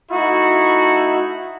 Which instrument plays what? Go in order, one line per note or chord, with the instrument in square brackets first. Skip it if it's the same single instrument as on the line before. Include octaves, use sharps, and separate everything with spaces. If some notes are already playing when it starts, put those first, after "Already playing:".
[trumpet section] A3 D#4 E4 F#4